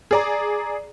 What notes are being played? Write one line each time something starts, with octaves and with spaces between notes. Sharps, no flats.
G#4 D5 A#5